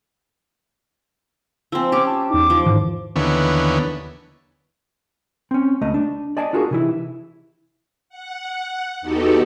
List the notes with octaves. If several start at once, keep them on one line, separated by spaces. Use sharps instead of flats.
F3 C4 G#5 C6 E6
C#4 G4 D6
A5
E2 D#4 D6
F3
G#2 D#3 E3
D#2 D3 E3 B3 C#5
C4 C#4
C#2 A3 D#5
D4
D5 D#5 G#5 A5
D4 F4 F#4 G#4 A#4
C3 E3 E4
F#5
E2 B3 D#4 F#4 G4 A4